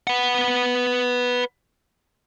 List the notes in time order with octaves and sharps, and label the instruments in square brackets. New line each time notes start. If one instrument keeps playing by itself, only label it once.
[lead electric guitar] B4 F#5